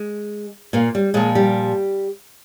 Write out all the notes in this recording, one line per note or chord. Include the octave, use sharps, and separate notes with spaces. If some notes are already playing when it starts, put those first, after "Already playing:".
Already playing: G#3
A#2 A#3
G3
A#2 F3 G#3
G3 G4